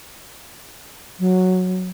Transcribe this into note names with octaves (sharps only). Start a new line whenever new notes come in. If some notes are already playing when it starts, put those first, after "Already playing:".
F#3